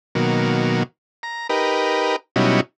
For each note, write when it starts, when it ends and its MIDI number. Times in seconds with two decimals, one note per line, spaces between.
0.15 0.83 47
0.15 0.83 51
0.15 0.83 54
0.15 0.83 58
1.23 1.47 82
1.49 2.16 63
1.49 2.16 67
1.49 2.16 70
1.49 2.16 71
2.36 2.61 47
2.36 2.61 54
2.36 2.61 55
2.36 2.61 61
2.36 2.61 63
2.36 2.61 64